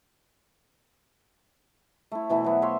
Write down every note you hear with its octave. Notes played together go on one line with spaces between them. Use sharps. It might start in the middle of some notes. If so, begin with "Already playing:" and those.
A3 E4
B2 E3 A3 E4
F#3 B3
C#5 E5 F5 C6